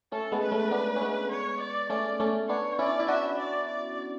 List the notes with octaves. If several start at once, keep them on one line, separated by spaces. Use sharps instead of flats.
A3 C#4 A4
G#3 B3
B4
A3 C#4
B3 D4
C#4
G#3 B3
C#5
D5
A3 C#4 D5
A3 C#4
B3 D4 C#5
C#4 E4 D5
E4
D4 F#4 E5
D5
D5